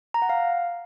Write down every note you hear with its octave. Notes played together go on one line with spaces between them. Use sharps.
A#5
F#5
F5